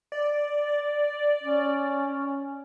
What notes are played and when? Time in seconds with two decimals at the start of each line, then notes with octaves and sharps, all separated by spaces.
0.12 D5
1.43 C#4